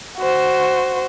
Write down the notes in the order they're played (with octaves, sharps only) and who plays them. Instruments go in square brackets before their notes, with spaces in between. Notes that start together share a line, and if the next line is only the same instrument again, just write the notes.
[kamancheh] F#4 C5